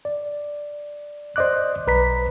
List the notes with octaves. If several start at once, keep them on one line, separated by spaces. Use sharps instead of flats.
D5
C5 D5 D#5 D6 F#6
B1 B4 A#5 B6